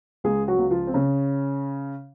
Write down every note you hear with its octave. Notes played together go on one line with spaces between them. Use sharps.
C#2 G#3 G#4
F#3 F#4
C#2
F3 F4
C4
C#3 C#4